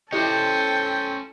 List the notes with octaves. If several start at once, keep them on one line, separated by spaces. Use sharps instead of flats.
C#4 E4 G4 A4 C5 D#5 G5